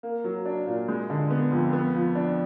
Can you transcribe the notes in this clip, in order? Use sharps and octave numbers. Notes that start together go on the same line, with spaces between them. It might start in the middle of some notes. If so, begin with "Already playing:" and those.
A#3
F#3
D4
A#2
G#3
D3
B3
F2
B3
F3
D4